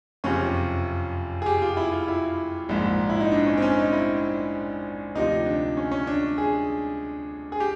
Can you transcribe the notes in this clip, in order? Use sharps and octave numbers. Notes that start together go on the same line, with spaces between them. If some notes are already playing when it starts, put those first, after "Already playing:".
F#1 F2 C3 F3 C#4
G#4
G4
F4
E4
F4
E4
A#1 G#2 F3
E4
D#4
D4
C#4
C4
C#4
D#4
E4
D2 C3 F3 D#4
D4
C#4
C#4
D4
G#4
G#4
G4